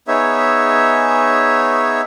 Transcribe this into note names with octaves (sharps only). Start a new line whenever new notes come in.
B3 D#4 G#4 C#5 E5